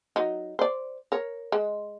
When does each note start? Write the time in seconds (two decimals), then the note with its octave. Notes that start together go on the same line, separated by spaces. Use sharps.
0.16 F#3 D#4
0.59 C5 D5
1.12 A#4 C#5
1.52 G#3